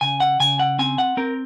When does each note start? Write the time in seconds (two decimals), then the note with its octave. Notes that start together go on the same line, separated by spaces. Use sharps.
0.01 C#3 G#5
0.20 F#5
0.40 C#3 G#5
0.59 F#5
0.79 C4 G#5
0.98 F#5
1.17 C4 A#4